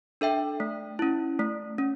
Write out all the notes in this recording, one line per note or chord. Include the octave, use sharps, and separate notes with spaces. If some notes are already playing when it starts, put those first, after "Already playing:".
D4 A4 E5 G5
A3
C#4 E4
A3
C#4